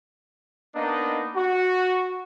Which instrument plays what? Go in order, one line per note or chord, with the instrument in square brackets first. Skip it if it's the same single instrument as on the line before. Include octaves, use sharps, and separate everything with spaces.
[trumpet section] A#3 B3 D4 D#4 D#5
F#4